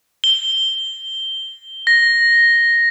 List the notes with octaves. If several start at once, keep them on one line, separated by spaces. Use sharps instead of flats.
G7
A#6